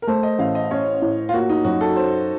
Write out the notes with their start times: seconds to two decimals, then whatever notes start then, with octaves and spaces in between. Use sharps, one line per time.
0.02 A#4
0.07 A3 C5
0.23 D#5
0.39 A1 F5
0.55 D#5
0.71 C#4 C#5
1.02 A2
1.29 F4
1.33 A#3 F#4
1.49 D#4
1.64 F#2 F#4
1.81 A4
1.96 C#4 C5